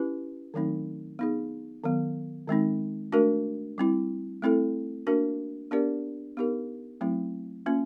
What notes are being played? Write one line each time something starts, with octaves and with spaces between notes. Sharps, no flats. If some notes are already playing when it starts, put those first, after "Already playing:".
Already playing: C#4 E4 G4 B4
D#3 F#3 A3 C4 D#4
B3 D#4 G#4
D#3 F#3 B3
D#3 G#3 C4 D#4
A3 D4 F#4 A#4
G3 C4 E4
A3 C4 E4 A4
A#3 D4 F#4 A#4
B3 D4 G4 A#4 D5
B3 D#4 G4 A#4
F#3 A3 C4 E4
A#3 C#4 F4